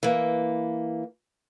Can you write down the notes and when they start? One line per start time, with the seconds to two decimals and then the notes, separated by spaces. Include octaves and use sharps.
0.03 E3 A#3